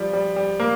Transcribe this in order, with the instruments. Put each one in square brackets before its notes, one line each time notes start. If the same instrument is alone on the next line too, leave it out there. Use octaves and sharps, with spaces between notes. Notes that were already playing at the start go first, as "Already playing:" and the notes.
Already playing: [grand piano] F3 G3
G3
G3
A#3